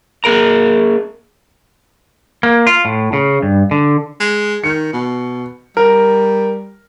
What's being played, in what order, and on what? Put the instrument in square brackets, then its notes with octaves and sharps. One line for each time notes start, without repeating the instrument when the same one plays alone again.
[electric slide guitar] A#3 G#4 A#4 A#5
A#3
F4
A2
C#3
G2
D3
[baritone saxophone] G#3
[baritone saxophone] D#3 [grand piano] C#7
[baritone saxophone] B2
[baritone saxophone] G3 [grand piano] A#4